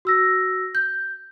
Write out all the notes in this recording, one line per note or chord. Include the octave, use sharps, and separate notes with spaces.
F#4 E6 A#6
G6